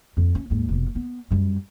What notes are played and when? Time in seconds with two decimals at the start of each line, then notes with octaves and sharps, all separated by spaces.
0.17 F2
0.35 C#4
0.50 D#2 G#2
0.69 F1 B2
0.95 B3
1.31 F#2 G3